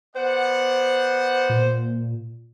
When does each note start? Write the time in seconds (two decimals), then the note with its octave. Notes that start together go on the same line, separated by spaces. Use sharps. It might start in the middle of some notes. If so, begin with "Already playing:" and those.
0.16 B3 C5 D5 F#5
1.49 A#2